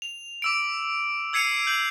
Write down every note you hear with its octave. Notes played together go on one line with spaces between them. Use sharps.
F7
D6 E6 D7
E6 G#6 C7 C#7 D#7 F7
G6 F#7